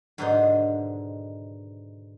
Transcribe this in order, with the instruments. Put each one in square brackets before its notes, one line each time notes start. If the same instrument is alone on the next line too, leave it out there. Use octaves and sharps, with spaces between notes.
[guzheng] G#2 B2 D3 D#3 D4 D#4